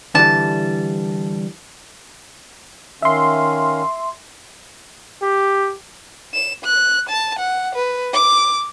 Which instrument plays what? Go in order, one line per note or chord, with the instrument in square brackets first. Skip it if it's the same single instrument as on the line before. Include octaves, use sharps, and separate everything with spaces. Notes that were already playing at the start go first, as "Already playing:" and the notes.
[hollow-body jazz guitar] D3 E3 G3 [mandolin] A5
[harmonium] D#3 C#4 F5 [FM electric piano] E5 C6
[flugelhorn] G4
[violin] E7
F#6
A5
F#5
B4
D6